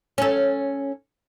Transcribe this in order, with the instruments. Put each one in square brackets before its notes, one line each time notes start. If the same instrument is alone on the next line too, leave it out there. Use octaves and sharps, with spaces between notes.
[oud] C#4 A4